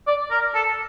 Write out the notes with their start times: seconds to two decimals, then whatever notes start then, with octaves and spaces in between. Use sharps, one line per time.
0.07 D5
0.31 A#4
0.55 A4